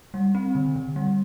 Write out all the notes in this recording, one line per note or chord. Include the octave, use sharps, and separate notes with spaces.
G3
C4
D3
D3
G3